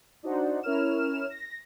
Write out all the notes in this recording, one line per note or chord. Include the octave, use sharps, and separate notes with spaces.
D4 D#4 F#4 C5 D5 F#5
C#4 E4 A#4 C#5 F6 E7
A#6